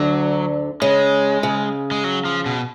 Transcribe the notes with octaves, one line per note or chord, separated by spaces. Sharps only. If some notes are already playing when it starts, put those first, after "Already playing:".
Already playing: D2 D3 F#3
C#3 G#3
C#3
G#3
F#3
F3
B2